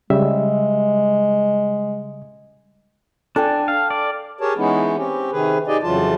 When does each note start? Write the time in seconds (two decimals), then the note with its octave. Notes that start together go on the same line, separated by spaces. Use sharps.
0.10 C#3 G3 G#3 E5
3.36 D4 A4 G5 G#5
3.68 F5
3.90 D5
4.41 G4 G#4 A#4 C#5 A5
4.57 E3 G#3 B3 C#4 D#4 E4
4.96 C4 C#4 G4
5.32 C3 D#3 G#4 B4
5.67 D#4 G4 G#4 D5 D#5
5.83 F2 C#3 E3 F#3 F4 A5